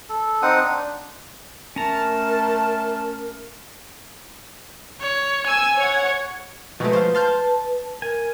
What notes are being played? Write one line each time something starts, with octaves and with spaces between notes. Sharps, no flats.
A4
C4 D#4 F#5 D#6
D4
A3 C#4 A#4 A5 A#5
C#5
G#5 E6 G#6
C#5 F#5
B2 F3 G#3 A3 D#4 B4 C#6
C5 F5
A5 C6 F6 G6
A#4 G#5